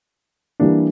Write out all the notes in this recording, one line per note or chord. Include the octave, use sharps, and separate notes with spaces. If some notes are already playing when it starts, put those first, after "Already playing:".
E3 G3 A#3 D4